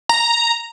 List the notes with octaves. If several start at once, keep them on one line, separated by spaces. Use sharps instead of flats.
A#5